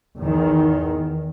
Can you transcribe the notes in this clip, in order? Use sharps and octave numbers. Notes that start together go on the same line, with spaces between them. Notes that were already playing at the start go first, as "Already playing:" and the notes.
E2 D#3